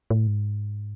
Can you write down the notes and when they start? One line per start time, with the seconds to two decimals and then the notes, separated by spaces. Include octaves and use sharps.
0.10 A2
0.27 G#2